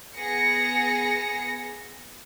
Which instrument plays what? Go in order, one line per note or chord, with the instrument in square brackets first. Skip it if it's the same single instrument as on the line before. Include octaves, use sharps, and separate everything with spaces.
[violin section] B3 G#4 A#6 C#7